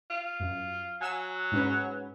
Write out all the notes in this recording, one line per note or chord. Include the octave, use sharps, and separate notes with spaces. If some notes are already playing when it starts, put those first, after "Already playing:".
F4
F#2
F#3 G#5 E6
G#2 C#4 B4